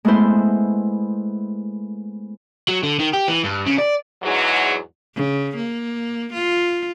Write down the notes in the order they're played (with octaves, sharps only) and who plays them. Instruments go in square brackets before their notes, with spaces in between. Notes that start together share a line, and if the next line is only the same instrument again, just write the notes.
[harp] G#3 A3 B3 E4 C5
[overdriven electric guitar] F#3
D3
D#3
G4
E3
G2
C#3
D5
[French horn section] E2 G#2 F#3
[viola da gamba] C#3
A#3
F4